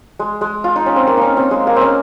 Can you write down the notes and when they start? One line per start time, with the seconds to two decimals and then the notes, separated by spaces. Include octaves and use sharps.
0.19 G#3
0.41 G#3
0.64 F4
0.76 D#4
0.86 C#4
0.96 C4
1.07 A#3
1.17 C#4 D#4
1.37 C4
1.51 G#3
1.67 A#3
1.76 C4 C#4